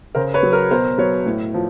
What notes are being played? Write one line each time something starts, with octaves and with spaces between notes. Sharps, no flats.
C#3 A#4 C5
B4 C#5
F#3
A#4
B2 A#4 C5
F#3 B4 C#5
A2
F3